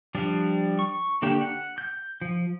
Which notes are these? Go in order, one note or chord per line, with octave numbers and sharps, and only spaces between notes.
F3 G3 D4
C#6
D3 A#3 D4 G4
F#5
G6
F3